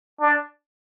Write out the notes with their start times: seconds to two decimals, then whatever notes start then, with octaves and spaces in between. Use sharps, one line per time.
0.21 D4